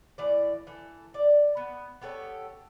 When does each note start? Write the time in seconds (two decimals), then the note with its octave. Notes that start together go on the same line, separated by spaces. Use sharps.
0.18 A2 E3 D5
0.67 E3 A4
1.14 D5
1.57 B3
2.02 B3 G4 A4 C#5